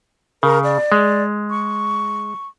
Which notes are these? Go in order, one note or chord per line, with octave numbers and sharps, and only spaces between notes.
C#3 A#4
D5
G#3
C#6